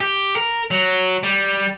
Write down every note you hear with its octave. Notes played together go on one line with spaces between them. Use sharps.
G4
A#4
F#3
G3